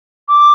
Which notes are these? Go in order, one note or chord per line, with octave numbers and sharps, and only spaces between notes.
D6